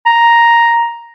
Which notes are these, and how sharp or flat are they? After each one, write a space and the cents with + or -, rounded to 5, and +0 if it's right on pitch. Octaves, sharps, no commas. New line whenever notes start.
A#5 +5